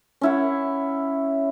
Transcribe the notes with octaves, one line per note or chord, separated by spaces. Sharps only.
C#4 E4 F#5